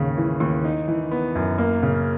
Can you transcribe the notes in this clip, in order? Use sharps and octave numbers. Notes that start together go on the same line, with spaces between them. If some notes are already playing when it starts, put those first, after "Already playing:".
Already playing: D#2 G#2 C#3
E3
D#2
D#4
E3
B3
F#2
A#3
C#3